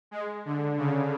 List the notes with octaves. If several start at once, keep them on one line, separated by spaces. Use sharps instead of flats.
G#3
D3
C#3